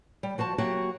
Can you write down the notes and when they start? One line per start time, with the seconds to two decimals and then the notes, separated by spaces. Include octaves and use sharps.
0.23 G3
0.38 F3 F#4 C5 A5
0.58 F#3 A#3 F#4 G4 E5